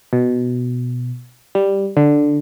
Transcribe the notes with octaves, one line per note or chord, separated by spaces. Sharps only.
B2
G3
D3